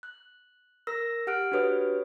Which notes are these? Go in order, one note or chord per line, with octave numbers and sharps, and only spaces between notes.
F#6
A#4 E6 A#6
G4 F#5 F6 F#6 D7
D4 F#4 G4 B4 C#5 D#6